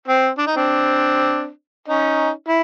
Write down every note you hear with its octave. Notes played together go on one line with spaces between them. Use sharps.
C4
D4
D#4
C4 D4
C#4 D#4
E4